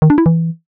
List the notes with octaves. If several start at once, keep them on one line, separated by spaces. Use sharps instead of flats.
D#3
D4
E4
E3